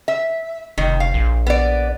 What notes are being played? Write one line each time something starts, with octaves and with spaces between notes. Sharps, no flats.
E5
F1 D#3
F5
A#1
B3 D5